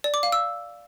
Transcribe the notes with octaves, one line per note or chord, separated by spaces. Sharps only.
D5
D6
F5
E6